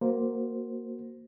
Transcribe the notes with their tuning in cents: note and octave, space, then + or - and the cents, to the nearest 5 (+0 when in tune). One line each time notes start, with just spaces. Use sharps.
A#3 +0 F#4 +0 C5 +0